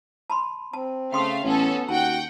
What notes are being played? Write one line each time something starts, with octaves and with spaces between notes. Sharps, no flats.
A5 B5 C6
C4 A5
C#3 A3 F5 G5 C6 D#6
A1 B3 C#4 A4
D#2 F#4 F#5 G5 A5